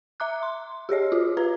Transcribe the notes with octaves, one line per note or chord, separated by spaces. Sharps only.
E5 A#5 D6 F#6
C6
G4 G#4 C#5 D#5
F4 F#4 G#4
F4 B4 A#5